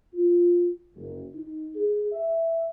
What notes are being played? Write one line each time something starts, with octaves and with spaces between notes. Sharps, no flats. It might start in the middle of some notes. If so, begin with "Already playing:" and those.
F4
F#1
D#4
G#4
E5